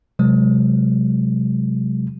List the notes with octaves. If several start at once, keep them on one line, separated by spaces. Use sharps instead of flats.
C3 F#3 G#3